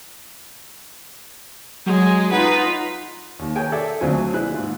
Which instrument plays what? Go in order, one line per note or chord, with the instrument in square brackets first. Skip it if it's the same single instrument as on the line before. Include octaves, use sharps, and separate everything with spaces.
[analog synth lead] F#3 [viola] G#3
[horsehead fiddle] D#4 F4 [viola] B4 [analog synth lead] F#5
[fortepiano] D#2
G#4 A#4 C#5 G5 G#5
A4 D5 E5
D2 F#3 C4 F4 G#5
E4 G#4 F#6
G#2 F4